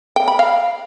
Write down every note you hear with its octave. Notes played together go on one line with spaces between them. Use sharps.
G5
B5
F5